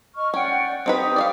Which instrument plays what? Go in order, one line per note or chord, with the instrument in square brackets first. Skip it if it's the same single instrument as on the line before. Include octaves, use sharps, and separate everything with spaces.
[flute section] D#5 C#6 F6
[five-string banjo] C#4 [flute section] D5 F#5 G5
[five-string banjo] C4 D#4 B4 [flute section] G4 D#6
[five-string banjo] D5 D#5 F5